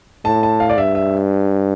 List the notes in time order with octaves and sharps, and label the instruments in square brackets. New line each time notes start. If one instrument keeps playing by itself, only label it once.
[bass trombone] A2 [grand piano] A5
[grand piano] A5
F5
D5
[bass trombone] G2 [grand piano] E5
[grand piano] E5